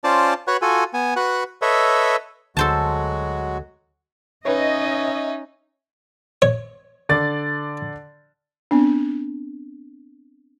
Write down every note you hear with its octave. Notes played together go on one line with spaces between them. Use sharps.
C#4 F4 C5 D5 A5
F#4 B4 C#5 F#5
F4 F#4 A4 G#5
B3 G#5
F#4 B4 F#5
A4 B4 C#5 D#5 E5
D2 F#3 G#3 F#4 A4 C5 A5
C#4 D#4 B4 C#5 D#5 E5
C#5
D3 D5 A6
B3 C4 D4